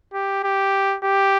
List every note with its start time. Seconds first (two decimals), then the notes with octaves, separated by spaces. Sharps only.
0.13 G4
0.43 G4
1.03 G4